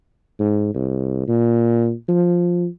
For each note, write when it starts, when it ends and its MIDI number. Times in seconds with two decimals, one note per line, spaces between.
0.39 0.70 44
0.74 1.22 36
1.28 1.91 46
2.08 2.67 53